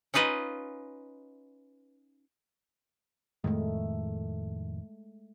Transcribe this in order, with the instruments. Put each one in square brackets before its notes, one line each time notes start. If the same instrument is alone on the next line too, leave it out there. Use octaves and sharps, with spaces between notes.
[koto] C#4 D#4 F4 B4 D#5
[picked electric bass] F2 A2 D#3 [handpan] G#3 A3